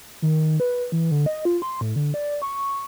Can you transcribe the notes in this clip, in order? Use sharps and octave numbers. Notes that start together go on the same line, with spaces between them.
D#3
B4
E3
D3
D#5
F4
C6
A2
D3
D5
C#6